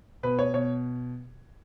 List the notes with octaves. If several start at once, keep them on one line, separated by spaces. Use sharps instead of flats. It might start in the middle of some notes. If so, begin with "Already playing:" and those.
B2 B4
C#5
B2 C#5